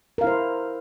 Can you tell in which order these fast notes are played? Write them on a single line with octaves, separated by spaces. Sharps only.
A#4 F5 E4 C5